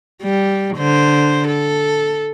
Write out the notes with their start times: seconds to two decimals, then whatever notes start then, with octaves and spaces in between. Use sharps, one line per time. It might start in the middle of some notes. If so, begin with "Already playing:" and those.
0.23 G3
0.76 D3 C5
1.48 A4